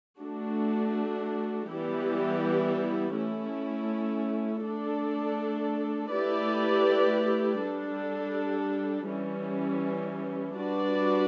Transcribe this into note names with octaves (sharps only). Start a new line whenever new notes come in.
A3 D4 F#4
E3 G3 B3 E4 G4
A3 C#4 E4
A3 D4 A4
A3 E4 G4 B4 D5
G3 D4 A4
E3 G3 C#4
G3 D4 F#4 B4 D5